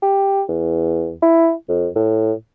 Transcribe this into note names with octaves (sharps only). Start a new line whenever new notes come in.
G4
E2
E4
F2
A2